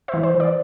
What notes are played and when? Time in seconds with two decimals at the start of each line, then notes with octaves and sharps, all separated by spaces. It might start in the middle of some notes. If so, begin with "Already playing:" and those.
0.08 C5 E5
0.14 E3
0.23 C5
0.35 E3
0.40 D5